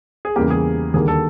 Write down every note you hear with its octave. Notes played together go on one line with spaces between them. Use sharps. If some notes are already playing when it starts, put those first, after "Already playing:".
G#4
E2 C#3 E3 G3 A#3 G4
G#4
D#2 D3 G3 A#3 G#4
A4